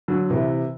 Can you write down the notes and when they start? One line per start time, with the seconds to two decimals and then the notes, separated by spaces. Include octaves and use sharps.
0.08 D3 F#3
0.30 C3 E3